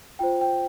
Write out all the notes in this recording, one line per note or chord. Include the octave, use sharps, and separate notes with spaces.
F4 C5 G5
G5